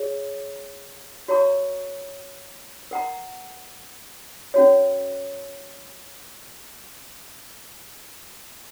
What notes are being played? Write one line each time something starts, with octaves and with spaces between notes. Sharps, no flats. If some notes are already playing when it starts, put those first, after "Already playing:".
Already playing: G#4 C#5
F#4 C#5 A#5 C#6
A#4 F#5 A#5
C#4 F#4 C#5